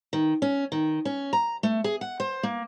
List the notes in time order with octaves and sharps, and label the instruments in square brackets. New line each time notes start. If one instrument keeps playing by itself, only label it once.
[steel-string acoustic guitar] D#3
C#4
D#3
C#4
A#5
A3
G#4
F#5
C5
A#3